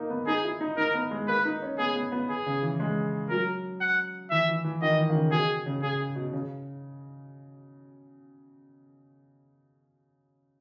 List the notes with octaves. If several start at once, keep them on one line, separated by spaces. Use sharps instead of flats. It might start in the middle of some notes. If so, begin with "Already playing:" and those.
Already playing: A#3 D#4
B3
D#4 G#4
E4
D#4
D#4 A#4
B3
G#3
A#3 B4
D#4
C#4
B3 G#4
B3
B3
G#4
C#3
E3
G#3
F#3 A#4
F#5
E3 E5
E3
E3
D#3 D#5
E3
D#3
C#3
B2 G#4
C#3
C#3 G#4
B2
C#3